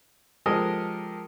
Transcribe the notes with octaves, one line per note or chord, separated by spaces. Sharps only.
F3 G#3 G4 A4 A#4 D#5